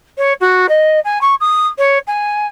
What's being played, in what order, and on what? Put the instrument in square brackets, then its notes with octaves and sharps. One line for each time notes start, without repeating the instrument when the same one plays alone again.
[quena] C#5
F#4
D#5
G#5
C#6
D#6
C#5
G#5